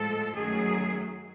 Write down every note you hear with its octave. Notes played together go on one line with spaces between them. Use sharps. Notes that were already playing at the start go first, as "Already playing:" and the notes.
Already playing: A2 F3 G#3 A4
F#2 D#3 F#3 A3 G#4